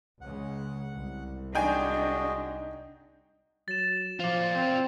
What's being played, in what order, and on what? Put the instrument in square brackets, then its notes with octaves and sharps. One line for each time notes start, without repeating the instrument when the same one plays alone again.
[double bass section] C#2 C#3 G#3 [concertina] F#5
[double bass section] C2
[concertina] G#3 F#4 D#5 [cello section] D4 [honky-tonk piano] D#4 G5 G#5
[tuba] F#3 [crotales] A6 E7
[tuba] F3 [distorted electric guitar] F4 D5
[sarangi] C4